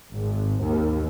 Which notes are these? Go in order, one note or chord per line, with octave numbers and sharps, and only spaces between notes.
G#1
D#2